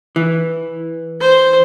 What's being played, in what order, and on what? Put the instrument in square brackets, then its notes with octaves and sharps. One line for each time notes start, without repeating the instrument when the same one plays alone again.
[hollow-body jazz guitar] E3
[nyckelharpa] C5